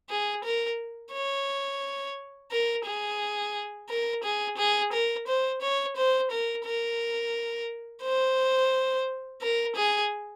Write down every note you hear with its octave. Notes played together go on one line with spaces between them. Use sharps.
G#4
A#4
C#5
A#4
G#4
A#4
G#4
G#4
A#4
C5
C#5
C5
A#4
A#4
C5
A#4
G#4